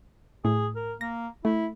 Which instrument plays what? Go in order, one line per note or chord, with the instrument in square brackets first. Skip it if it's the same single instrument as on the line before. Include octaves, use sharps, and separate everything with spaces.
[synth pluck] A2 [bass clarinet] G#4
[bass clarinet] A#4
[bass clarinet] A#3 [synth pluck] A#6
[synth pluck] A3 [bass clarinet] E4